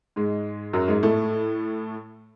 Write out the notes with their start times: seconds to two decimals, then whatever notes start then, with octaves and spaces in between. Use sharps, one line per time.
0.16 G#2 G#3
0.73 F#2 F#3
0.88 G#2 G#3
1.03 A2 A3